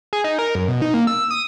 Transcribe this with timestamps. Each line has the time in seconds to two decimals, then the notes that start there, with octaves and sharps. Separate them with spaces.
0.13 G#4
0.24 D#4
0.39 A#4
0.55 F#2
0.68 B2
0.82 D#4
0.94 A#3
1.07 E6
1.31 D#6